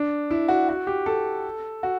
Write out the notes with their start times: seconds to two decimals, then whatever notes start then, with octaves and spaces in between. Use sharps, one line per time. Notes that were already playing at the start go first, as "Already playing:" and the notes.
Already playing: D4
0.31 E4
0.48 F#4
0.69 F#4
0.87 G4
1.06 A4
1.83 F#4